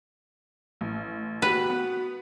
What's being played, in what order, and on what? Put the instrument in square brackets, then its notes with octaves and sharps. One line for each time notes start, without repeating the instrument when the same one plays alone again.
[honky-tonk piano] A1
[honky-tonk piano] A#3 G4 [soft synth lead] F#4 [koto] B4
[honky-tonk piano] B3